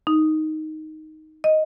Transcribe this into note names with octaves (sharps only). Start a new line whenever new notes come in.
D#4
D#5